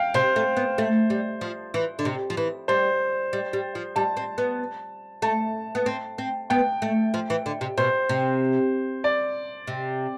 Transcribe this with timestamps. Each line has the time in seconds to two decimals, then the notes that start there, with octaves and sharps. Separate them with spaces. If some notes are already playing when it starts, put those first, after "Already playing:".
Already playing: F5 G5
0.14 C3 C5
0.36 A3
0.57 B3
0.78 A3
1.10 G3
1.41 F3
1.74 E3
1.99 D3
2.05 C3
2.30 F3
2.37 E3
2.68 G3 C5
3.33 G3
3.53 G3
3.75 F3
3.96 G3 A5
4.17 C4
4.38 B3
5.22 A3 A5
5.75 B3
5.86 C4
6.18 C4
6.50 B3 G5
6.82 A3
7.14 F3
7.30 E3
7.46 D3
7.61 C3
7.78 B2 C5
8.09 C3
9.04 D5
9.67 C3